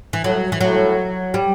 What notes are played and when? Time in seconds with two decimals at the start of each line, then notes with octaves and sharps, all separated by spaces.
0.13 E3
0.24 A2 F#3
0.52 E3
0.61 A2 F#3
1.34 G3